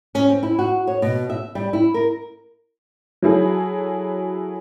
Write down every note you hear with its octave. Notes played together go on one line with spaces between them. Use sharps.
C#4
C4
E4
F#4
C#5
B2
E5
G3
E4
A#4
F#3 E4 G#4 A4